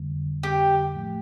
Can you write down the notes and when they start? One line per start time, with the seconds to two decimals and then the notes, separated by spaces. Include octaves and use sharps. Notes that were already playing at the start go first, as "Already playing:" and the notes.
Already playing: F2 D3 G3
0.43 G4
0.93 A2 F3 A3